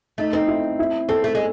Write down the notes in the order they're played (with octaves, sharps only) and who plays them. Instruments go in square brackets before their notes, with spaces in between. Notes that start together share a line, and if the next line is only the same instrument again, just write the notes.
[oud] A3 [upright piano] D#4
[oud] C4 [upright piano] D#4
[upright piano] E4
E4
[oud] C4 [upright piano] A4
[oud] A3 [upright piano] A4
[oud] G#3